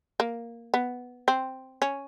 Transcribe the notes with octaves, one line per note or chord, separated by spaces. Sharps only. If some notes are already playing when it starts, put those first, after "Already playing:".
A#3
B3
C4
C#4